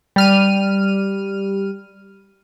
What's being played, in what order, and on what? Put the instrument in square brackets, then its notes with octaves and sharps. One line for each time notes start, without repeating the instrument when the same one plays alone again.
[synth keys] G3 F6 D#7